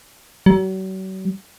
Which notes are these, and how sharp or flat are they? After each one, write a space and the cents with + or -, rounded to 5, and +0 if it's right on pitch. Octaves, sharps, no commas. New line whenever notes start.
F#3 +40